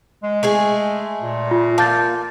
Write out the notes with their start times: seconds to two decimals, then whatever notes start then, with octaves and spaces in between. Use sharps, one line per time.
0.23 G#3
0.43 A3 G#4 G#5
1.22 A#2
1.51 F4
1.78 A#3 A5 G6 A6